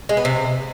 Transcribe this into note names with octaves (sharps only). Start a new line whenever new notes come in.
G#3
B3
C3